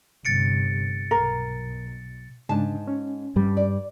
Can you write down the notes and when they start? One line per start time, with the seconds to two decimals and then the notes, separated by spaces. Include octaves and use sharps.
0.25 G1 C3 A6 C#7 D7
1.11 B1 B2 A#4
2.49 G#2 C#3 D4 A5
2.87 C#4
3.36 G2 G3
3.57 D5